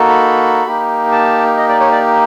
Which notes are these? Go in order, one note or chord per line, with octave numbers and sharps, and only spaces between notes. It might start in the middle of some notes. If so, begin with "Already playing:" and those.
Already playing: A#3 D#4 F#4 A4
B5
A#3 D#4 G4
A5
D#5
D5
C#5
D5